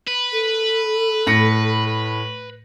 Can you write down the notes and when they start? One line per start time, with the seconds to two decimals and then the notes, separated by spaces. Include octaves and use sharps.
0.07 B4
0.33 A4
1.27 A2 A#6 C#7